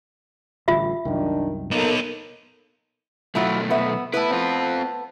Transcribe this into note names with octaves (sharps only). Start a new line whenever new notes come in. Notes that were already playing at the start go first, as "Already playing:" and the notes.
A1 D3 G3 F4 E5
C2 F#2 D#3 D4
A#3 B3 D#4 A4 A#4
B1 F#3 A3 E4 F4
B3 E5
A3 B3 E4 B4
C4 F4